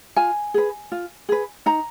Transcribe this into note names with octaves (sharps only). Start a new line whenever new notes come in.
F4 G#5
G#4 B4
F4
G#4 B4
D#4 A#5